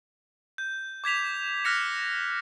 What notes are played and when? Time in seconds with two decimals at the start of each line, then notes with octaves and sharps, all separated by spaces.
0.58 G6
1.04 D6 G#6 B6 F7
1.65 F6 F#6 A#6 B6 C#7 F7